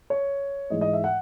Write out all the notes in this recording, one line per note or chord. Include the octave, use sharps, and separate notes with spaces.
C#5
G#2 E3 G#3 D#5
D#5
E5
F#5